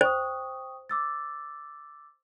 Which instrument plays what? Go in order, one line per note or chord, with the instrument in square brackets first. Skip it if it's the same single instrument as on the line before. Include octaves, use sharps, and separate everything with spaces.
[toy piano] C5 [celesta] G5 C#6 D#6
[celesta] D6 E6 A6